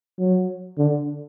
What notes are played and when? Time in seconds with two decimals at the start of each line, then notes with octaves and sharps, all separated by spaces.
0.19 F#3
0.78 D3